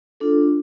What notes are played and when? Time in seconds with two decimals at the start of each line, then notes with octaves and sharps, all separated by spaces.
0.20 D4 F4 A4